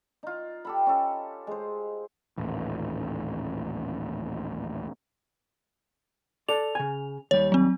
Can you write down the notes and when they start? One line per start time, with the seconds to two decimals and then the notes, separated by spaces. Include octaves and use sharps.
0.23 D#4 F4
0.65 G4 A4 B5
0.87 C#4 A4
1.47 G#3 C5
2.37 D#1 A1
6.49 A4 D5 F7
6.75 C#3 G#5
7.31 D#2 G3 C#5
7.52 F#3 C4